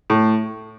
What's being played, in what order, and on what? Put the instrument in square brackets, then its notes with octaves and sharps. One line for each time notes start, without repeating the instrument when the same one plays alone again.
[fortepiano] A2